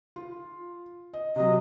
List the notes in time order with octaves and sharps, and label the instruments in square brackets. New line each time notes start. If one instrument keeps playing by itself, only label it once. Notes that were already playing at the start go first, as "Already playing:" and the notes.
[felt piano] F4
D#5
[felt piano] C3 F#3 [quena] D#5